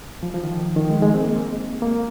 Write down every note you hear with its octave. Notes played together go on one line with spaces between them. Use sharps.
F3
F3
D#3
D#3
G#3
G#3
C4
A#3
A#3